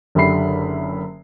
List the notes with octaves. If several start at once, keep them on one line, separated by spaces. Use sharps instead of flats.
F#1 D3 G4 E5 B5 C7